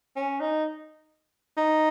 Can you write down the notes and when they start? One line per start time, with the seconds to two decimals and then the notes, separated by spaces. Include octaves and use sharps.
0.16 C#4
0.40 D#4
1.57 D#4